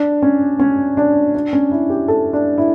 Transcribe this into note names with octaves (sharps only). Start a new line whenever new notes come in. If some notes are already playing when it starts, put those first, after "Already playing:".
Already playing: D4
C#4
C#4
D4
D4
C#4
E4
G4
A4
D4
E4